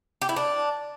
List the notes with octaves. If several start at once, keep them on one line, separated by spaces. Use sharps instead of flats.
G4
E4
D4